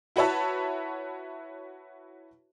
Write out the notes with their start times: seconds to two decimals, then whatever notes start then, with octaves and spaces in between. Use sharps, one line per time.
0.16 E4 F#4 B4 C#5 E5 A5